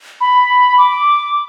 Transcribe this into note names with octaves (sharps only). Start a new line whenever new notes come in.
B5
D6